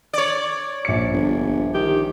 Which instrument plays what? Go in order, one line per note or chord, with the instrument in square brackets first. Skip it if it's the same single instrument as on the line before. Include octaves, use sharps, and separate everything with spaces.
[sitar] C#5 D5
[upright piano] A#1 C#7
[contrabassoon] G1
[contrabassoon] D#3 [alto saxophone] G4